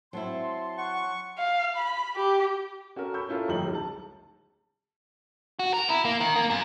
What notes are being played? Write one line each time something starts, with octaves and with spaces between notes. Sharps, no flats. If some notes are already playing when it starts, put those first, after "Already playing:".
F#3 C4 E4 A5 C6
F#5 C#6
F5
B5
G4
C#4 F#4 A4 A#4
B5 C#6 E6 G6
C#4 E4 F4 A4 A#4
G1 D#2 F3 A3 D#4 F#7
D1 C#2
A5
F#4
A#4
E4
A#3
D#3
A#3
F#2